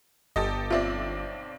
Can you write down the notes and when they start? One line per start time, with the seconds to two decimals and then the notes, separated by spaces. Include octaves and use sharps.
0.36 G1 G4 A4 D#5
0.70 B1 C4 F4 D5 E5